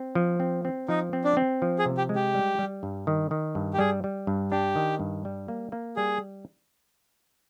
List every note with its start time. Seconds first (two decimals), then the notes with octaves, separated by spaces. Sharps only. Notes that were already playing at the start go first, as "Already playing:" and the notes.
Already playing: C4
0.15 F3
0.40 C4
0.65 C4
0.89 F3 D#4
1.13 C4
1.24 D4
1.37 C4
1.62 F3
1.79 G#4
1.86 C3
1.97 G4
2.09 G#3
2.16 G4
2.35 G3
2.59 G3
2.83 G2
3.07 D#3
3.31 D#3
3.55 G2
3.73 G4
3.79 G3 G#4
4.04 G3
4.27 G2
4.51 D4 G4
4.76 D#3
5.00 G2
5.25 G3
5.48 A#3
5.72 A#3
5.96 G3 G#4